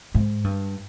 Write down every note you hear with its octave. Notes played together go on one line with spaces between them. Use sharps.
G#2
G2